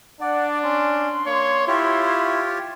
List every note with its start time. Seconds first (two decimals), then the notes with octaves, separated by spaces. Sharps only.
0.21 D4 D5 F#5
0.63 C#4 C6
1.26 A#3 C#5
1.68 E4 F4 G4 C#5